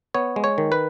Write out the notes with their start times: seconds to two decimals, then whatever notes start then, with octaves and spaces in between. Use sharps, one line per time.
0.14 B3 C#5
0.36 G#3
0.44 C#5
0.58 D#3
0.72 B4